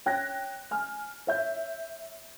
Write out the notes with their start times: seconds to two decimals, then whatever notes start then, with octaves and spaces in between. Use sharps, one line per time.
0.06 C#5 G5 F#6 G#6 A#6
0.71 G#5 F6
1.27 C#5 E5 G6